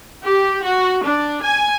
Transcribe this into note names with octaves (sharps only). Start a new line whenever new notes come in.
G4
F#4
D4
G#5